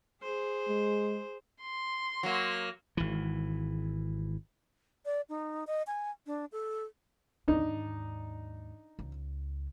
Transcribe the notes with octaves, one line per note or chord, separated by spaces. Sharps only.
G#4 C5
G#3
C6
F#3 A#3
G#1 E3
D5
D#4
D#5
G#5
D4
A4
D#2 G#2 D4 D#4
C#2